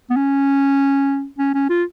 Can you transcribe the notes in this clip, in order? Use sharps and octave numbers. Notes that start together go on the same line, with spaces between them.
B3
C#4
C#4
C#4
F4